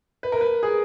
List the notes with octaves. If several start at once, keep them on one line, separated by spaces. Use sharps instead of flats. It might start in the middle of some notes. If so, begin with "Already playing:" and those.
B4
A#4
B4
G#4